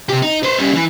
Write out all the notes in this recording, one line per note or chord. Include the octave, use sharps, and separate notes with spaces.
C3 G4
D#4
B4 C5
G3 C#4
E3 E4